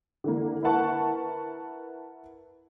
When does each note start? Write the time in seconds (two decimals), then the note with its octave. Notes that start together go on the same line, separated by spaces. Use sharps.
0.24 D3 E3 A#3
0.63 E4 A#4 B4 F#5 A5 C#6